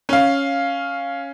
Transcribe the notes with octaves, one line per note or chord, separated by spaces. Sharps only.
C#4 F5